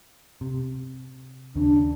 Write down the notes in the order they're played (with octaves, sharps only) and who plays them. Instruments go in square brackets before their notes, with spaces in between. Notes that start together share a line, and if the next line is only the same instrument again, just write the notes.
[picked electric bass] C3
[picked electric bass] D#2 C#3 [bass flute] D4